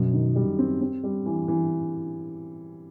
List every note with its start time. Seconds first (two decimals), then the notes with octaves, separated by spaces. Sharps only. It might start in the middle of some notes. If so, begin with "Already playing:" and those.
Already playing: F#2 B2
0.13 D#3
0.36 G3
0.59 C4
0.81 C4
1.04 G3
1.26 E3
1.48 E3